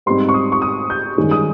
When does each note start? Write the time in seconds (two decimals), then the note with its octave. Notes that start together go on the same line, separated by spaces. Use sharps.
0.06 G#2 G3 C4 D#4 C6
0.29 C#6
0.34 D#6
0.52 C#6
0.62 D#6
0.90 G6
1.17 G2 D#3 G#3 C#4
1.31 D#6